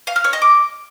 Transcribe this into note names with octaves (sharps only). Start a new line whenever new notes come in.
F5
F6
C#5
D#5
D6